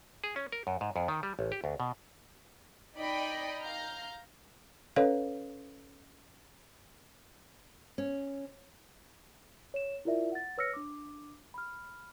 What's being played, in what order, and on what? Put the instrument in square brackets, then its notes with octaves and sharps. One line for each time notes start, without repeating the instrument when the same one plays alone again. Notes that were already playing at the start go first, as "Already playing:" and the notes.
[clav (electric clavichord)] G#4
C#4
A#4
F#2
G#2
F2
D#3
G3
A1
G4
D2
B2
[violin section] D#4 D5 D#5 G5 B5
F5 A#5 F6 G6
[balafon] C#4 A4 B4 C#5 D#5 F5
[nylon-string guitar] C#4
[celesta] C#5 E7
E4 F4 A#4 D5 E5
F#5 A6
B4 C#5 E6 F6 A#6 C#7
D4 D6
B5 F6